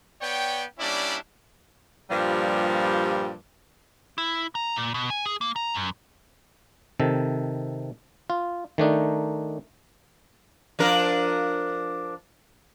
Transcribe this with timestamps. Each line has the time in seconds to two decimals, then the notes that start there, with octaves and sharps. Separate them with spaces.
0.21 B3 C#5 D5 G5
0.79 G3 A#3 C#4 D4 E4 D5
2.10 G2 A#2 F3 G3
4.18 E4
4.55 A#5
4.76 A#2
4.94 B2
5.10 G#5
5.26 G#4
5.41 A#3
5.56 A#5
5.74 F#2
7.00 C3 D#3 A4
8.30 F4
8.78 D#3 A3 D4 D#4
10.79 F3 D4 A#4